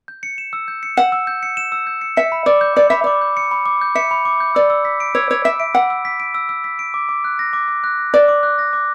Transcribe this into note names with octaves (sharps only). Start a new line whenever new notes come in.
G6
C#7
E7
E6
G6
C#7
F#5 E7
E6
G6
C#7
E7
E6
G6
C#7
E5 C#7
B5
D5 D6
G6
D5 C#7
E5 B5
D5 D6
G6
C#7
B5
D6
G6
E5 C#7
B5
D6
G6
D5 E6
E6
B6
D7
C#5 E6
C#5 E6
E5 B6
D7
F#5 E6
E6
B6
D7
E6
E6
B6
D7
D6
D6
F#6
A#6
D6
D6
F#6
A#6
D5 D6
D6
F#6
A#6
D6